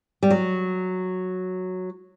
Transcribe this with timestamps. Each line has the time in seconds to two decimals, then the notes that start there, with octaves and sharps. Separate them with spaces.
0.23 G3
0.30 F#3